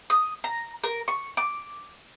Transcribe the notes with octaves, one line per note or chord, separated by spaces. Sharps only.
D#6
A#5
A#4
C#6
D6